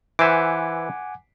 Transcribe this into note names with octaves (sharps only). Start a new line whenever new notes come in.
E3 C5 E5 F#5 G#5 D6